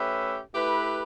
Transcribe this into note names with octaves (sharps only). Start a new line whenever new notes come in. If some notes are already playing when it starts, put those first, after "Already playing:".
Already playing: A3 C#4 G4 B4 E5
A3 E4 G4 B4